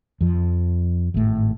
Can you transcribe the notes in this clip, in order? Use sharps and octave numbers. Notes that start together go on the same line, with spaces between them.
F2 F3
G#1 A2